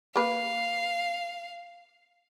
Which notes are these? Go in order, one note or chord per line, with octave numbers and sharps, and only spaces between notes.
A#3 B4 F5